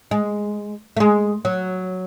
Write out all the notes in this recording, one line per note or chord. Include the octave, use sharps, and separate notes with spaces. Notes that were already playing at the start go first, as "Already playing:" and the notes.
G#3
A3
G#3
F#3